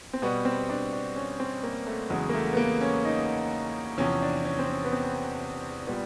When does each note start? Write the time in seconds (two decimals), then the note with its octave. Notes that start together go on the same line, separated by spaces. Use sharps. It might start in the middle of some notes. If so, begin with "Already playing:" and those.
0.13 C4
0.22 B2 G3 B3
0.45 C4
0.69 D4
0.93 D4
1.16 C#4
1.40 C4
1.63 A#3
1.87 A3
2.10 E2 C#3 F#3 G#3
2.29 A#3
2.34 A3
2.53 B3
2.57 A#3
2.81 C#4
3.05 D#4
3.98 E2 C3 F3 C#4
4.22 D4
4.45 C#4
4.59 C4
4.70 C#4
4.84 B3
4.93 C4
5.87 A#2 G3 B3